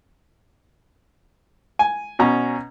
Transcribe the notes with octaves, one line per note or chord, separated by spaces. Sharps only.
G#5
B2 C#4 A#5